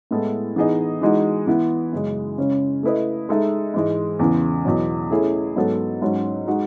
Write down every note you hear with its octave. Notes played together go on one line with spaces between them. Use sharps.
A2 G#3 B3 E4 A4
E3 B3 D#4 G#4 D#5
E3 G#3 D#4 F#4
E3 B3 E4
F#2 C#3 G#3
C#3 G#3 C#4
A3 E4 B4 D#5
G#3 D#4 A4 E5
G#2 E3 G#3
E2 C#3 E3
E2 B2 F#3
A3 C#4 E4 G#4
G#2 F#3 B3 F#4 A4
G#2 F#3 C#4 F#4
G#3 D#4 F#4